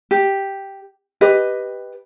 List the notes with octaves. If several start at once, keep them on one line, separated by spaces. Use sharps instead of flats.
G4
G4 B4 D#5